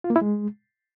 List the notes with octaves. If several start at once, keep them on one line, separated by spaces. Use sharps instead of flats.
F4
A#3
E4
G#3